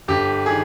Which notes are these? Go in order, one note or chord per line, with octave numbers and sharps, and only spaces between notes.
G1 G4
D#3 G#4